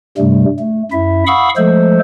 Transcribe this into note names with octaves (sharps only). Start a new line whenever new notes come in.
G2 C3 G3 A3
A3
F#2 E4 E5
F5 F#5 B5 C#6 D#6 E6
F3 G#3 A3 A4 C5